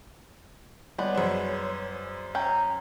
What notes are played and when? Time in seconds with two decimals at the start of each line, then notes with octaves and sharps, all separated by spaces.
0.98 G3 G#3 B3 C#5
1.15 F#2 G#4 C5
2.35 C#4 G5 A#5